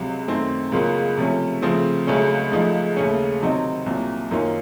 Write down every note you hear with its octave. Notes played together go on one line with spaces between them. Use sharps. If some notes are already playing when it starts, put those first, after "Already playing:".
Already playing: C#2 C3 F#3
F#2 D#3 A3 C4
C#2 C#3 F#3 A#3 F4
C3 F3 A3 C#4
C#3 F3 A3 C4
C#2 C#3 F#3 A3 C#4
C#2 C#3 F3 A3 D#4
D#2 C#3 A3 C#4
C3 D#3 F#3 C4 D#4
C2 A#2 F#3
F#2 D#3 A#3 C#4 F4